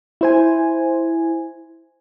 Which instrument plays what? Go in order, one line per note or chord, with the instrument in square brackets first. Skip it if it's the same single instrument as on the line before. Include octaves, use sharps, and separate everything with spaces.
[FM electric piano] E4 C5 G#5